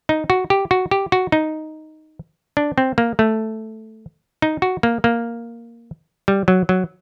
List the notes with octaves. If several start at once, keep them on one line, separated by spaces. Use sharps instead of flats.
D#4
F#4
G4
F#4
G4
F#4
D#4
D4
C4
A#3
A3
D#4
F#4
A#3
A#3
G3
F#3
F#3